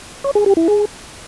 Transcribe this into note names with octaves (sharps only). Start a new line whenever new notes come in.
C#5
G#4
G4
E4
G#4